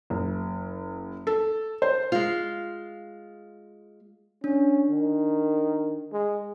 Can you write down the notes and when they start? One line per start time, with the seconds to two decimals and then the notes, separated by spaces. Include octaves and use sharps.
0.10 F#1
1.27 A4
1.82 C5
2.12 G#3 F4
4.44 C#4 D4
4.90 D#3
6.12 G#3